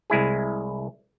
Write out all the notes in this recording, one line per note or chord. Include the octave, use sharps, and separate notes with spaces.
C2 G#3 E4 G#4